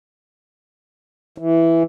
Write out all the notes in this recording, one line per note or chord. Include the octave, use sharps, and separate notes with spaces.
E3